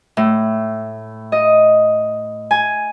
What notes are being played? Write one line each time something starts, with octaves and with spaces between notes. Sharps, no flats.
A2
D#5
G#5